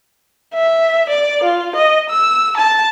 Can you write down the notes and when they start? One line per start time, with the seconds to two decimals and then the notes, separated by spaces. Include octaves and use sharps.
0.54 E5
1.09 D5
1.43 F4
1.76 D#5
2.10 E6
2.57 A5